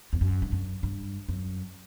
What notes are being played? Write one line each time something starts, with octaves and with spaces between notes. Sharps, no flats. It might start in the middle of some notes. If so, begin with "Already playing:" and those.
E2
F#2
G2
F#2
G2
F#2